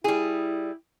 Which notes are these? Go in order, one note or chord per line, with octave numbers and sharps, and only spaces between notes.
G3 E4 G#4